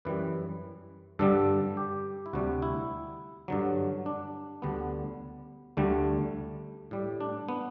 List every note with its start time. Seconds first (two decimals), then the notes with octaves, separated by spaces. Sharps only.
0.05 F#2 E3 G3 B4
1.19 G2 D3 G3 A4
1.77 G4
2.26 E4
2.33 D2 C3 G3 F#4
2.62 E4
3.48 G2 D3 F#3
4.06 D4
4.62 D2 D3 G3 B3
5.77 D2 D3 G3 A3
6.91 A2 G3
7.21 D4
7.49 B3